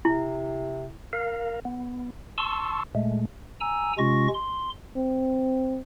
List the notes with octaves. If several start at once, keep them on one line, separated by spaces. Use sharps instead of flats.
C3 E4
A#4 F5
B3
A5 C6 C#6 E6
A#2 G#3 A3
G#5 A#5 E6
C3 G#3 C#4 F4 C#6 A#6
C6
C4